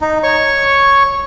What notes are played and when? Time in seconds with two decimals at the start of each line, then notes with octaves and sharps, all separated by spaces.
0.01 D#4
0.23 C#5 C#6